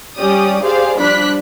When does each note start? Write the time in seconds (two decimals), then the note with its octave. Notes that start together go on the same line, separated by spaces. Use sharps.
0.17 G3 C#4 G4 D5 D#6
0.63 G4 G#4 C5 D5 F5
0.98 F3 G3 D4 B5 F#6 B6